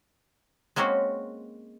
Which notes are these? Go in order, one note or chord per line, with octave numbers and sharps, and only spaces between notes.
G#3 A#3 C4 C#4 F#4